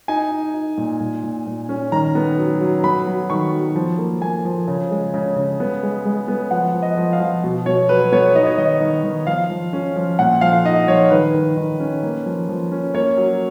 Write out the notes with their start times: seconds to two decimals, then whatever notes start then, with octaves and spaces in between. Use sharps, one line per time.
0.08 D#4 G#5
0.31 D#4
0.54 D#4
0.78 A#2
1.00 A#2
1.23 A#2
1.46 A#2
1.69 C#4
1.92 D#3 A#5
2.15 B3
2.39 F#3
2.61 F#3
2.84 B3 B5
3.07 F#3
3.30 D#3 C#6
3.53 F#3
3.76 F3
3.98 A#3
4.22 A#3 G#5
4.45 F3
4.68 C#3
4.91 G#3
5.14 C#3
5.36 C#3
5.60 B3
5.83 G#3
6.05 G#3
6.28 B3
6.51 F3 F#5
6.74 F3
6.82 D#5
6.97 F3
7.13 F5
7.20 F3
7.44 B2
7.66 B2 C#5
7.89 F#3 B4
8.12 B3 C#5
8.35 D#4 D#5
8.47 C#5
8.58 D#3 D#5
8.81 D#3
9.04 D#3
9.27 F3 F5
9.50 F3
9.73 C#4
9.96 F3
10.19 A#2 F#5
10.41 F3 F5
10.64 D#4 D#5
10.87 F3 C#5
11.10 D#3 B4
11.34 D#3
11.57 D#3
11.80 C#4
12.03 A#3
12.26 F3
12.49 F3
12.72 C#4
12.94 A#3 C#5
13.17 F#3